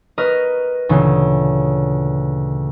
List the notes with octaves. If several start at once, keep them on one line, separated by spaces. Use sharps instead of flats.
A#4 B4 D#5 C#6 F6
D2 A#2 C#3 E3